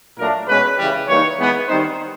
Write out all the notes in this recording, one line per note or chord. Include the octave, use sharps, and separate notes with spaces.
A#2 F#3 A3 D4 A#4
B2 G#3 C#4 B4
C#3 E3 G3
E3 G3 A#3 D#4 C#5
E3 G#3 B3
D#3 G3 C4 D#4 C5